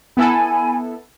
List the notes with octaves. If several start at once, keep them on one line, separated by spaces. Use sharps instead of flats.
B3 E4 A4 G#5 B5